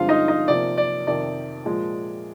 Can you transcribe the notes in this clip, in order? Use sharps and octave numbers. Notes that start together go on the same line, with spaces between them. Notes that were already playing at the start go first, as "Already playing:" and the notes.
Already playing: G2 D3 F3 G#3 C4 F4 F5
D#4 D#5
D#4 D#5
C3 F3 A#3 D5
D5
F2 C3 D#3 D5
A#2 F3 G#3